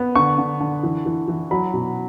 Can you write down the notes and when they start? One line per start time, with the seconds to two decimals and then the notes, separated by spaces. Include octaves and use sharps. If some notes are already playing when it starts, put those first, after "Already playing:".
Already playing: B3
0.15 D3 C#6
0.38 D3
0.60 D3
0.83 E3
1.06 E3
1.28 E3
1.51 F#3 B5
1.74 B2